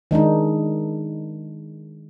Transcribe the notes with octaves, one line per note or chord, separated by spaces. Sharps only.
D#3 G#3 D4 D#4